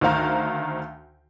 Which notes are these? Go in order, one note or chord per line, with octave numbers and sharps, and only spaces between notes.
D2 D#3 C5 F5 A#5